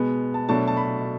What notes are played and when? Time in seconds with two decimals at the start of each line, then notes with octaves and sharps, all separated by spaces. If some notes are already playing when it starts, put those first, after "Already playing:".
Already playing: B2 G#3 B3
0.34 A5
0.48 B2 F#3 A3 D4 A5
0.67 A5
0.77 B5